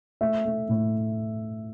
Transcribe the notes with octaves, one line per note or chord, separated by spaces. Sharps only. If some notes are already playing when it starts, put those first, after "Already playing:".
A3 E5
A3
A2